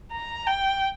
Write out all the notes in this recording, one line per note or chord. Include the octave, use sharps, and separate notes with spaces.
A#5
G5